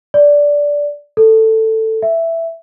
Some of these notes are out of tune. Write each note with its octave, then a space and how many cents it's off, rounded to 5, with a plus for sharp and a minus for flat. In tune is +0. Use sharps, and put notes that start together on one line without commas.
D5 -10
A4 +10
E5 +5